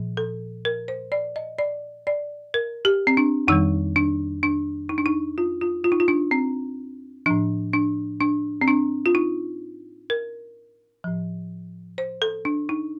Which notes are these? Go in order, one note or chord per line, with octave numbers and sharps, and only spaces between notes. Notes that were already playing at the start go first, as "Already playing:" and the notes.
Already playing: A#2 F3
A4
A#4
C5
D5
D#5
D5
D5
A#4
G4
C4
D4
F2 D#3 G3 D#4
D4
D4
D#4
D4
D#4
F4
F4
F4
D#4
F4
D4
C4
A2 F3 D4
D4
D4
C4
D4
F4
D#4
A#4
A2 F3
C5
A4
D4
D#4